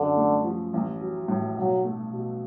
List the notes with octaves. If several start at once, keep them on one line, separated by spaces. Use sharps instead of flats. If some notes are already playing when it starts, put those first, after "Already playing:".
Already playing: F#2 D3
A3
F3
A1
F#3
A2
B1 F#3
A3
B2